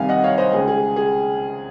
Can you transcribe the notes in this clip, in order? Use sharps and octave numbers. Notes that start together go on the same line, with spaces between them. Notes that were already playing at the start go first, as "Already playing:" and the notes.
Already playing: C2 C3 D#3 F5 G#5
D#5 F#5
C#5 F5
C5 D#5
C#2 C#3 G#4
G#4
G#4